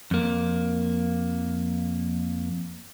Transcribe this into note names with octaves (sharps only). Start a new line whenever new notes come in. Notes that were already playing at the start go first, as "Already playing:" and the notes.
F2 A#3